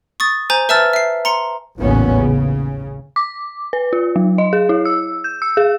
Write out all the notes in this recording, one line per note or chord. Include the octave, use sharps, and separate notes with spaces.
C#6 D#6 A6
C5 G#5 A#5 G6
B4 E5 A5 E6 F6 A6
E5 C7
A#5 C6 C#7
A1 D#2 A#2 C#3 B3 C#4
C#3
D6
B4
F4
F#3
D#5
G#4
E4
E6
G6
E6
G#4